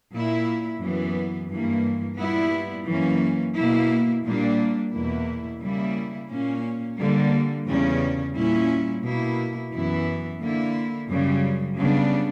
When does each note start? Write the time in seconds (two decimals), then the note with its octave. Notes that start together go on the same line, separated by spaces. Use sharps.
0.12 A#2 A#3 E4
0.80 F#2 E3 B3
1.49 G2 E3 A#3
2.17 A#2 G3 B3 E4
2.87 F#2 E3 A#3 C#4
3.55 B2 A#3 E4
4.24 A#2 G3 A#3 D4
4.92 E2 B2 A#3 E4
5.60 C#3 G3 A#3 E4
6.29 A#2 A#3 C#4
6.98 D3 G3 A#3
7.66 E2 C#3 G3 C#4
8.35 A#2 G3 C#4 E4
9.03 B2 A#3 E4
9.72 F#2 E3 B3 E4
10.41 D3 A#3 E4
11.09 F#2 C#3 G3
11.77 C#3 G3 B3 D4